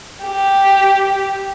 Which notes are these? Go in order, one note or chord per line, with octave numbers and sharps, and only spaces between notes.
G4